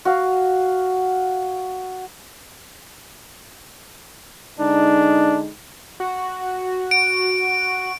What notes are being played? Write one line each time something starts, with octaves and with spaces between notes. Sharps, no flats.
F#4 F5
D3 G#3 D4 D#4
F#4
D7